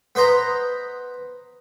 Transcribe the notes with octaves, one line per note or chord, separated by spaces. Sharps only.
B3 B4 C5 D#5 A#5